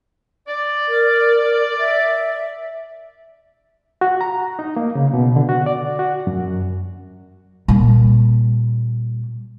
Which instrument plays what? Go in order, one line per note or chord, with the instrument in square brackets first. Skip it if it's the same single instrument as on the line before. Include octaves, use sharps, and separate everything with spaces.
[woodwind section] D5
[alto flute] A#4
E5
[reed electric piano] F#4
A#5
D#4
A#3
C#3
B2
D3
F#4
D5
F#4
F#2
[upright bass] A#2 G3